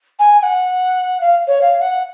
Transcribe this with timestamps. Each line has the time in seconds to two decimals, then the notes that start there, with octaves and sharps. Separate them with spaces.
0.19 G#5
0.39 G#5
0.43 F#5
1.21 F5
1.47 C#5
1.61 F5
1.81 F#5